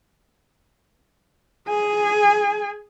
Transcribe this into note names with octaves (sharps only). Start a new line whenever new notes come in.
G#4 G#5